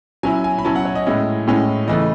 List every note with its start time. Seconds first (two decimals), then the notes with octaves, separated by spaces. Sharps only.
0.23 F#3 C#4 E4 G#5
0.44 G#5
0.58 B5
0.64 F#3 C#4 E4 A5
0.75 F#5
0.85 C#5
0.95 D#5
1.06 A2 G#3 C#4 E4
1.47 A2 G#3 C#4 E4
1.87 C#3 E3 A3 D#5